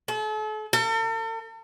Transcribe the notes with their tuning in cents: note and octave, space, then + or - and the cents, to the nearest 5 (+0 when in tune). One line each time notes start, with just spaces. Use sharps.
A4 -40
A4 +45